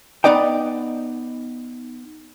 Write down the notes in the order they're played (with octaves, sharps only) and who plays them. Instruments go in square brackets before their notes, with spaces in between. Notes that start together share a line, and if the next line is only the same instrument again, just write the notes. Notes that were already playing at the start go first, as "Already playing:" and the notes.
[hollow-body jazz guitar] B3 D#4 D5 D#5 G5